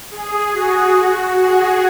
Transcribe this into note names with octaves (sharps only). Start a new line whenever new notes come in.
G#4
F#4
G#4